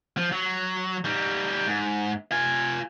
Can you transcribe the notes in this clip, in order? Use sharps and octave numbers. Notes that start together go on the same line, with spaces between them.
F3
F#3
G3 D#4
G#2
F4 G#5